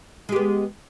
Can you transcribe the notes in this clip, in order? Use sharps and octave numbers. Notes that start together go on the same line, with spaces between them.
G#3 B3 G4